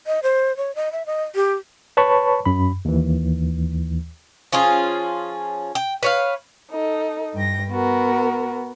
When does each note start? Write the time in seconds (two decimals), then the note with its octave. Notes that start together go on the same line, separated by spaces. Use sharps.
0.07 D#5
0.23 C5
0.57 C#5
0.75 D#5
0.92 E5
1.06 D#5
1.35 G4
1.97 B4 C#5 A5 B5 C#6
2.45 F#2 B5
2.85 D#2 E3
4.52 F3 C#4 F4 G#4
5.75 G5
6.03 B4 C#5 F5
6.71 D#4 A4
7.35 G2 G5 A#6
7.71 B3 F#4 A#4